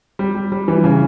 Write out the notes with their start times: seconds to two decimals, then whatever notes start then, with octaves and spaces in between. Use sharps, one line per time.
0.19 G3
0.35 G3
0.52 G3
0.68 E3
0.84 C#3